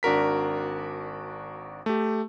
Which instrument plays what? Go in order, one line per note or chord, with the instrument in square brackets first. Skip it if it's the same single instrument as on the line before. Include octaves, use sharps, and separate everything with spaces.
[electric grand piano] G#1 D4 F#4 A#4 B6
A3 G4